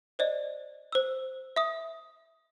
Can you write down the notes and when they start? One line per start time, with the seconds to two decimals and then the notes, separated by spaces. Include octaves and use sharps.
0.19 C5 D5 D#5
0.92 C5 E6
1.56 E5 D#6